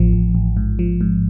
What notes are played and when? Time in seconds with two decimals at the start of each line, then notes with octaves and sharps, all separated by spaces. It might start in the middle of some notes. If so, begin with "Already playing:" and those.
Already playing: A1 F3
0.13 A1
0.35 A1
0.57 G#2
0.79 F3
1.01 G#2